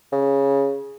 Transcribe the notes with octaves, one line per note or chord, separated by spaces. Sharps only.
C#3